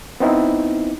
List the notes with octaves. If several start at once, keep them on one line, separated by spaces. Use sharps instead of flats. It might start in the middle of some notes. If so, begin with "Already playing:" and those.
B3 C4 D#4 E4